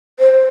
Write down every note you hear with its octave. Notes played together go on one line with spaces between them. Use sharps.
C5